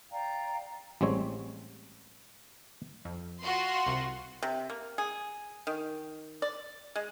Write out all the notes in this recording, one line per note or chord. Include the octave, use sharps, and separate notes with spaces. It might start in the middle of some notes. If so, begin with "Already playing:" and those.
D5 F5 G5 A#5
A1 G3 G#3 C4 C#5
F2
F4 F#4 C6
C2 C3
C3
A#3
G#4
D#3
D5
G#3